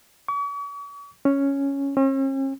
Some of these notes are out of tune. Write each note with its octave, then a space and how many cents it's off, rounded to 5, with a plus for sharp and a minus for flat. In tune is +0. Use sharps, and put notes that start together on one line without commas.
C#6 +45
C#4 +0
C#4 -45